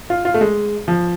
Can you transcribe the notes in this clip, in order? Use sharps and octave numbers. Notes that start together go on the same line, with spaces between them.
F4
F4
A3
G#3
F3